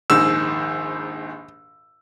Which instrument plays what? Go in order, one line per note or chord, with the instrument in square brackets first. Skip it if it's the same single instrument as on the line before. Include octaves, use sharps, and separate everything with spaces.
[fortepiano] A#1 D#2 G#2 [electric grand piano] E6